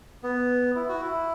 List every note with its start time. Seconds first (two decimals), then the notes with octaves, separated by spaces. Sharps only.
0.23 B3
0.76 E4
0.89 F#4
1.01 E4